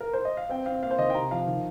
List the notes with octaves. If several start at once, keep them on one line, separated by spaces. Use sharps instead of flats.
A#4
C5
D#5
F5
C4 G5
C4 F5
A#3 F5
C5
D#3 D#5
G5
C3 A#5
F3 F5
D#3